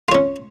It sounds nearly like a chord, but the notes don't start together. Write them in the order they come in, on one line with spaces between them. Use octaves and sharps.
F4 C#5 C#4